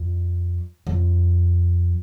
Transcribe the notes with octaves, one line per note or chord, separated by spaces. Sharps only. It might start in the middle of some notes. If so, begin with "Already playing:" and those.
Already playing: F2
F2